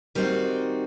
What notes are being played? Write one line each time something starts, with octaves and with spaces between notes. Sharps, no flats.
D#3 G3 C4 D#4 F#4